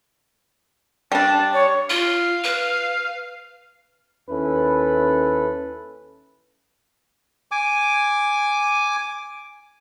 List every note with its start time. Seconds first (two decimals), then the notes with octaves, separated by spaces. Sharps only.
1.12 G3 D4 A5
1.54 C#5
1.90 F4 F5
2.44 B4
4.30 D#2 C#4 E4 A4 B4
7.51 G#5 D6